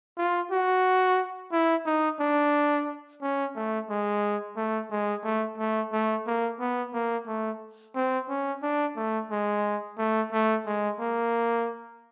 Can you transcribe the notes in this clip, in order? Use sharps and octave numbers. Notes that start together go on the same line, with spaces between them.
F4
F#4
E4
D#4
D4
C#4
A3
G#3
A3
G#3
A3
A3
A3
A#3
B3
A#3
A3
C4
C#4
D4
A3
G#3
A3
A3
G#3
A#3